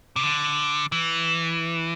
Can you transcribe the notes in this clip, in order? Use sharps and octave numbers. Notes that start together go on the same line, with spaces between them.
C3
D3
E3